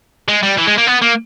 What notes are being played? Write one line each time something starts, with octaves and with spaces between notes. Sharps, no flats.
G#3
G3
E3
G#3
A#3
B3
A#3